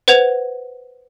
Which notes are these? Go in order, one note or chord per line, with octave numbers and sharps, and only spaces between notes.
B4 C5 F#5 G#6 F7